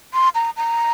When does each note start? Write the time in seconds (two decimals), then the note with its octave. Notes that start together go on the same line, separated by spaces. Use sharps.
0.14 C6
0.35 A#5
0.57 A#5